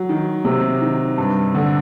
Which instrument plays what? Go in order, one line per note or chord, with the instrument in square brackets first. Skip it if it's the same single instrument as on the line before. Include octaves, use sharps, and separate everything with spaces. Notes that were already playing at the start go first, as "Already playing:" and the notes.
Already playing: [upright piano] F#3
D#3
C3
D#3
G2
D3